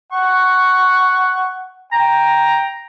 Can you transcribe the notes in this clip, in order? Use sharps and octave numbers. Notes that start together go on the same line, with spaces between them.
F#5 C#6
G5 A#5